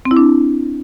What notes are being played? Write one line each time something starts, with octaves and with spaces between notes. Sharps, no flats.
C4
E4
D4